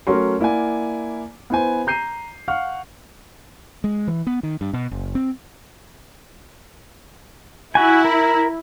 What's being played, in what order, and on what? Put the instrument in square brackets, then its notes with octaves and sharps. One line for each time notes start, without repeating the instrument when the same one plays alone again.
[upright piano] F#3 A3 C#4 F#4 A#4 C6
A#3 E4 D5 F#5 G#5
B3 E4 C5 G#5
A#5 G6 C7 D#7
F5 F#5 C#6 F6
[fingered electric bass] G#3
E3
B3
D#3
G2
B2
F#1
C4
[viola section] E4 [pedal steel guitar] F#4 G#5
[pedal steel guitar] A#4